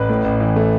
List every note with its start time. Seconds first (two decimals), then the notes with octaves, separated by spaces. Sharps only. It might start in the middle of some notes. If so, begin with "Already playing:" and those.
Already playing: A1 B4
0.10 A2
0.24 A1
0.40 E3
0.56 A3